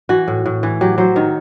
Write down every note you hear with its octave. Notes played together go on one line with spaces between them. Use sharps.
E3 F#4
A2
A2
E3
F#3 G4
F#3 C5
D#3 C#5